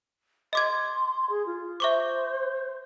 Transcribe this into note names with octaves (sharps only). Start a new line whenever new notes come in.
D#5 C6 D6 G#6
G#4
F4
C5 E5 C#6 D6